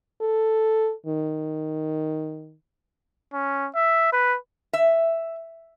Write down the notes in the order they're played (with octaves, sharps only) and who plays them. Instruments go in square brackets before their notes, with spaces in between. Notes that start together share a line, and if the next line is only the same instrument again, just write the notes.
[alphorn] A4
D#3
[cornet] C#4
E5
B4
[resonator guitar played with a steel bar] E5